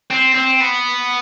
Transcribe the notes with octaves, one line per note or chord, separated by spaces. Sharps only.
C4
C4
B3